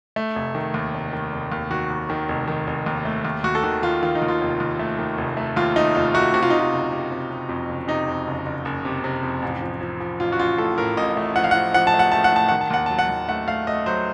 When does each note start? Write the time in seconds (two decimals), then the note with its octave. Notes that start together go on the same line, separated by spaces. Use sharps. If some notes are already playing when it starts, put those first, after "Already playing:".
0.16 A3
0.36 F1
0.55 D#3
0.74 D#2
0.94 F1
1.13 D#3
1.32 F1
1.52 D#2
1.71 D#3 F#4
1.90 D#2
2.10 D#3
2.29 F1
2.48 D#3
2.67 F1
2.86 D#2
3.05 A3
3.25 D#2
3.44 D#2 F#4
3.55 A4
3.63 D#3 F#4
3.82 D#3 F4
4.02 D#3 F4
4.15 D#4
4.22 D#2
4.28 F4
4.41 F1
4.60 D#2
4.79 A3
4.99 D#3
5.18 F1
5.37 A3
5.56 D#2 F4
5.76 A3 D#4
5.95 F1 F4
6.14 A3 F#4
6.34 C3 F#4
6.43 F4
6.50 C3 D#4
6.59 F4
6.73 F#1
6.91 C3
7.11 C3
7.31 C3
7.49 F2
7.69 F#1
7.88 C3 D#4
8.08 F2
8.27 F#1
8.46 F#1
8.65 F#1
8.85 C3
9.04 C3
9.23 F2
9.42 A1
9.62 F3
9.81 F3
10.00 F3
10.20 A1 F4
10.32 F#4
10.39 A1 F4
10.58 A2 A4
10.78 A2 A#4
10.97 A1 D#5
11.17 A3
11.36 F3 F#5
11.44 F5
11.51 F3 F#5
11.74 F3 F#5
11.87 A5
11.94 A3
11.99 F#5
12.12 A3 A5
12.24 F#5
12.32 A2 A5
12.48 D#3 F#5
12.61 A5
12.70 D#2 F#5
12.86 F#3 A5
12.99 F#5
13.09 D#2
13.29 A3 F#5
13.48 A3 F5
13.67 A3 D#5
13.86 F#3 C5